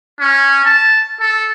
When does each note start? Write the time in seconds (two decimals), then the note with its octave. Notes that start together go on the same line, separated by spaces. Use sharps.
0.20 C#4
0.65 A5
1.20 A4